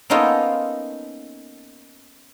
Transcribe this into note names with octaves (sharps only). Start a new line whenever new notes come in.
A#3 B3 C#4 D#4 F4 A4